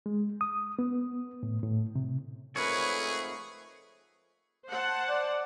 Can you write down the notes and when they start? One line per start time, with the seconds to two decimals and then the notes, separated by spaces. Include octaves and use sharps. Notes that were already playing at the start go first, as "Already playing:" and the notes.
0.06 G#3
0.41 D#6
0.79 B3
1.43 A2
1.63 A2
1.96 C3
2.56 F2 G#2 A3 G#4 A#4 B4 C#5
4.70 C5 F#5 A5
5.09 D5